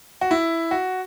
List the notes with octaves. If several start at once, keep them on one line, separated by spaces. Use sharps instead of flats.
F#4
E4
F#4